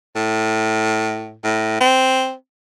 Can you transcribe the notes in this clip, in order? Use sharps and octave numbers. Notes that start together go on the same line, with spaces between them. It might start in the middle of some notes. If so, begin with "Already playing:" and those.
A2
A2
C4